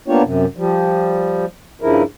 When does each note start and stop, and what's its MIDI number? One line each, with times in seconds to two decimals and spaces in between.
0.08 0.23 58
0.08 0.23 59
0.08 0.23 62
0.08 0.23 65
0.08 0.23 67
0.08 0.23 73
0.24 0.45 42
0.24 0.45 48
0.57 1.45 53
0.57 1.45 55
1.82 2.03 43
1.82 2.03 49
1.82 2.03 53
1.82 2.03 64
1.82 2.03 70